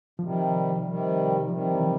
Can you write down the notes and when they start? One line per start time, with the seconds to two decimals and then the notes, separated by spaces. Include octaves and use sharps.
0.19 C3 D#3 F3 G3
0.85 C3 D#3 G3
1.49 C3 D#3 F3 G3
1.75 E3
1.82 F3